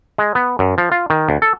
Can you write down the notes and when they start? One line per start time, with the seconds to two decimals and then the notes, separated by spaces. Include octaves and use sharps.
0.18 G#3
0.35 B3
0.59 F#2
0.78 F3
0.92 F4
1.10 D#3
1.29 D2
1.42 A4